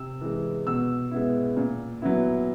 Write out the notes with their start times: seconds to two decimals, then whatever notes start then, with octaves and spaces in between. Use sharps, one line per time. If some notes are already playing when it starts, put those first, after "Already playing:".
Already playing: C3 E6
0.21 E3 G#3
0.67 B2 E6
1.11 G#3 B3 E4
1.57 A#2
2.02 F#3 B3 E4